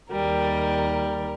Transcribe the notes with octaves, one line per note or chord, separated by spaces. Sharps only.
D#2 G3 A#4